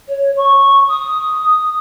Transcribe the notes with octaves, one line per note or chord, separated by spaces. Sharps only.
C#5
C#6
D#6